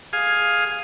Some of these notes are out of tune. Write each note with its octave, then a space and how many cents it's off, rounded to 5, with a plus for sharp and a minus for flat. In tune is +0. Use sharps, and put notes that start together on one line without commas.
G#4 +0 F5 +10 G#5 +0